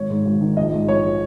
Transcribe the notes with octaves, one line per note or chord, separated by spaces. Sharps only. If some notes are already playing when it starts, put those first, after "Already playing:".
Already playing: G#1 C#5
G#2
G#1
D#3
A#1 D#5
G#2
A#1 C#5
F3